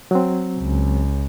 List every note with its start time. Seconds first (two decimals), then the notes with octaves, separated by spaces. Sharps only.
0.11 F#3 C4
0.59 C#2